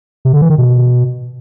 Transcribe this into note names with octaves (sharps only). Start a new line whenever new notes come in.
C3
D3
E3
D#3
B2